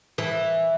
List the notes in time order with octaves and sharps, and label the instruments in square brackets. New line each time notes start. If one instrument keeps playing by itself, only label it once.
[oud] E3